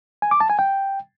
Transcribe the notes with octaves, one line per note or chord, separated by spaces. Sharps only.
G#5
D6
A5
G#5
G5